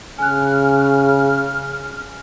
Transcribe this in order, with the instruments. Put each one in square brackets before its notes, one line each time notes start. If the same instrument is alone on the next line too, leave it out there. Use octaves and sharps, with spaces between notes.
[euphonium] C#3 [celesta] G#5 F#6 [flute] F6